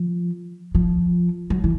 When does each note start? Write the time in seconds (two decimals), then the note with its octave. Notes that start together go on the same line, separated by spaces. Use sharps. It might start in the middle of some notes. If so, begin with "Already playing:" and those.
Already playing: F3
0.75 F3
1.50 F#3
1.64 E3